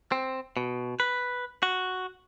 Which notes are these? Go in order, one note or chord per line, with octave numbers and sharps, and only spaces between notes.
C4
B2
B4
F#4